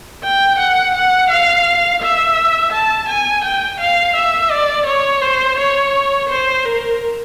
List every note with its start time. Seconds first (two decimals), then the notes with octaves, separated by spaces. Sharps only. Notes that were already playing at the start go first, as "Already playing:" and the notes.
0.23 G5
0.59 F#5
0.95 F#5
1.30 F5
2.02 E5
2.73 A5
3.09 G#5
3.45 G5
3.80 F5
4.16 E5
4.51 D5
4.87 C#5
5.22 C5
5.58 C#5
6.29 C5
6.65 A#4